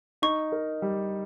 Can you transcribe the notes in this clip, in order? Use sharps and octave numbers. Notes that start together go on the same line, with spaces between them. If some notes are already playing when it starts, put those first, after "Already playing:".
D#4 C#6
A#4
G3